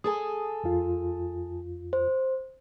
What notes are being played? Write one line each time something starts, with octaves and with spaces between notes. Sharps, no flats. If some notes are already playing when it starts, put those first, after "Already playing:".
G#4 A4 G#5 D#6
F2 F4
C5